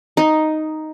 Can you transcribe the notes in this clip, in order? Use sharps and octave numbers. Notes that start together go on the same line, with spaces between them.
D#4